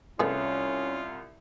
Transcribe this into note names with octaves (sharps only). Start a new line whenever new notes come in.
C2 A3 B3 C#4 F4 G#4